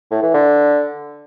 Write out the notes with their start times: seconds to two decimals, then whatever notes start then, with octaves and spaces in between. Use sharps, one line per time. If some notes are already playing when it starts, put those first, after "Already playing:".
0.11 A2
0.22 E3
0.34 D3